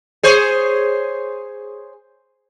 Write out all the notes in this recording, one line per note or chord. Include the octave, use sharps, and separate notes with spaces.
G#4 C5 C#5